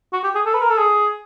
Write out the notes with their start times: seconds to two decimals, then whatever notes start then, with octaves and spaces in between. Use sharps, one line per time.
0.13 F#4
0.23 G4
0.35 G#4
0.46 A4
0.54 B4
0.62 A#4
0.70 A4
0.78 G#4